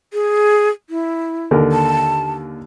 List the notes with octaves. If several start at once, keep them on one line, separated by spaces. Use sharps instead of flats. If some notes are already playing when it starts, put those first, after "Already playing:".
G#4
E4
D#2 D3 A#4
A5